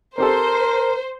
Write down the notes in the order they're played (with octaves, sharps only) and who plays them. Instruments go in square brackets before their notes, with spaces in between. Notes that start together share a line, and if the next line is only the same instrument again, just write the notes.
[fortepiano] C4 G4 A4 [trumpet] A#4 [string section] C5